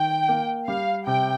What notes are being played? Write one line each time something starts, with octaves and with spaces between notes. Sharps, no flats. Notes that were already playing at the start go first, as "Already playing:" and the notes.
Already playing: D#3 G5
A#3
G3 F5
C3 G5